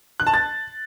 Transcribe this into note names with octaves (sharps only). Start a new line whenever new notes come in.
F#6
A5
A6